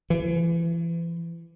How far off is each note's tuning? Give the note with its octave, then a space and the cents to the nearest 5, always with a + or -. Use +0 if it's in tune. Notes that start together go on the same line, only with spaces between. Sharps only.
E3 +35